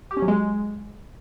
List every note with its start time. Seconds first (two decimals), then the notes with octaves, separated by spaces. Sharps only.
0.11 G4
0.17 C#4
0.22 F#3
0.28 G#3